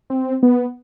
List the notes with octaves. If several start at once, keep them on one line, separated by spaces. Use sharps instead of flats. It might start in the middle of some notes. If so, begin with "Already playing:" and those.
C4
B3